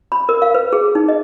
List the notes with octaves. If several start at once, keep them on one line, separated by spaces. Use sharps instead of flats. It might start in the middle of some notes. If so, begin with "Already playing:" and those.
B5
A#4
F5
B4
G#4
D#4
D#5